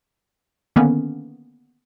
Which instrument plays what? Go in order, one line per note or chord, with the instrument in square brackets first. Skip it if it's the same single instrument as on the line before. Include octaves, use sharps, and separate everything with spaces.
[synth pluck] D3 D#3 A#3 B3 C#4